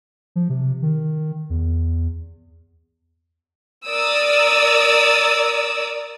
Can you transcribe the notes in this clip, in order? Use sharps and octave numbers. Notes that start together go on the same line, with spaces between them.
F3
C3
D#3
E2
A#4 D5 D#6 E6